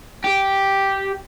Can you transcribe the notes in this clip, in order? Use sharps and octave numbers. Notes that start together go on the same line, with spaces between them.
G4